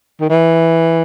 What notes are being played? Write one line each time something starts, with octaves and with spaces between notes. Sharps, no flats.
D#3
E3